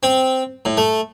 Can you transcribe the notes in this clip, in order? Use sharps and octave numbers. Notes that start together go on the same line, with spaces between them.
C4
A2
A3